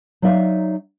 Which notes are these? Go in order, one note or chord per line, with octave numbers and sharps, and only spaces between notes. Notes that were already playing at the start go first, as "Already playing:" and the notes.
F#3 D#4 D5 E5 F5